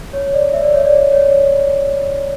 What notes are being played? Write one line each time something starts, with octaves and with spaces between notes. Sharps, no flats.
C#5
D5
E5
D5
C#5
D5
C#5